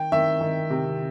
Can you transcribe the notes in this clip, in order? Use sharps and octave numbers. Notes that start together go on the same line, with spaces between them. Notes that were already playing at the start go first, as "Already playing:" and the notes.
Already playing: D#3 G5
D#3 E5
D#3
C3